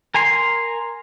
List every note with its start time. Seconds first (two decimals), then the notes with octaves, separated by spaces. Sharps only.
0.14 A#4 G#5 A#5 C6